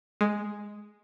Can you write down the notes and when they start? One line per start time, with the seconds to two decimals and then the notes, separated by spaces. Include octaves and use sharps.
0.21 G#3